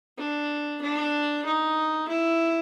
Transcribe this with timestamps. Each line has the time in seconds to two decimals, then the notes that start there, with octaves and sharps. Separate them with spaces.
0.18 D4
0.82 D4
1.45 D#4
2.08 E4